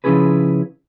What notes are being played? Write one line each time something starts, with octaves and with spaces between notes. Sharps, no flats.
C#3 F3 C#4 E4 G#4 B4